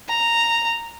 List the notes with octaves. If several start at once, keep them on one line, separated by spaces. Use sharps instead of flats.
A#5